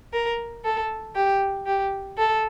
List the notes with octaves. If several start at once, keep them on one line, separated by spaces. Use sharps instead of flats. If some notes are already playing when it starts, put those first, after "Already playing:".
A#4
A4
G4
G4
A4